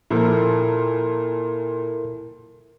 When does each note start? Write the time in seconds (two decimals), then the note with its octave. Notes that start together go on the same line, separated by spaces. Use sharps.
0.10 A#2 F3 E4 A4 A#4